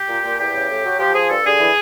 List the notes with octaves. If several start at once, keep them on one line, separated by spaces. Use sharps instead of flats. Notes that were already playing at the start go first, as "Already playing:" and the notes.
Already playing: G4
A#2
A#2
E2 G4
C#3
A2
F#3
F3 G4
F3 G#4
G2 A4
D3 G#4
E3